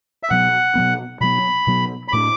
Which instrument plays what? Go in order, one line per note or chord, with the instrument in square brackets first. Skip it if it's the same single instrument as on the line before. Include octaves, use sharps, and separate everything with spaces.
[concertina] E5
[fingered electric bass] B2 F#3 B3 [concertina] F#5
[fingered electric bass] B2 F#3 B3
[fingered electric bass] B2 F#3 B3 [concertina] B5
[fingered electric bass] B2 F#3 B3
[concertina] B5
[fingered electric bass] A2 A3 D4 [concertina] D6